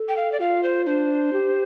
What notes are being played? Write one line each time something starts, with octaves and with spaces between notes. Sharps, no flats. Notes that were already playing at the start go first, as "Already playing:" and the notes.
Already playing: A4
G5
F5
D5
F4 F5
C5
D4 C5
G4